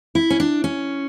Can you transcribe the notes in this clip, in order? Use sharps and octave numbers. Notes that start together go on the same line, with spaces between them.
E4
C#4
D4
C#4